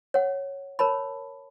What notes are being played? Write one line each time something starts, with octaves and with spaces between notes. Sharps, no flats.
C#5 F#5
A#4 C#5 A5 B5